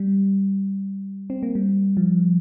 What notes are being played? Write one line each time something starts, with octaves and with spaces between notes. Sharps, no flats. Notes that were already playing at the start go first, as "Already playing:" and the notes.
Already playing: G3
C4
A#3
G3
F3